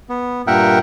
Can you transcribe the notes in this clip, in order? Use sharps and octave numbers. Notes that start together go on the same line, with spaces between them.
B3
G2 A#2 A#4 E5 F#5 G5